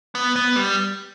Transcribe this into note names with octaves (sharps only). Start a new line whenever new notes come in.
B3
B3
G3